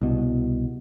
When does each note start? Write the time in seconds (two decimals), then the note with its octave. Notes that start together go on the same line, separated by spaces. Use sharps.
0.01 C2 B2